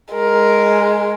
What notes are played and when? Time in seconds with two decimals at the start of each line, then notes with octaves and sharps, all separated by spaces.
0.14 G#3 A#4